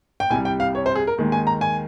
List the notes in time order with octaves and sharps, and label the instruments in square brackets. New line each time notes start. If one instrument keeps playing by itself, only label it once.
[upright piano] G5
C2 C3 G3 G#5
G5
F5
C#5
C5
G#4
A#4
D#2 D#3 G#3
G#5
A#5
G#5